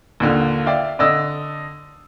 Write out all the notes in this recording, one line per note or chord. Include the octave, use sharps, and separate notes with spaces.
A#1 D#2 D3
D5 E5 F5 G5
D3 D5 D#5 E6